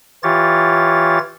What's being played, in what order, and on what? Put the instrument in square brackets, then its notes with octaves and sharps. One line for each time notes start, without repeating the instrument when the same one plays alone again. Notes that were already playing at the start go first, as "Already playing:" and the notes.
[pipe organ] E3 F4 G4 C#5 A6